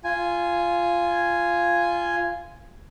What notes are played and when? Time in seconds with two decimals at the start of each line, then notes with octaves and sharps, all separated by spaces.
0.04 F4 G#5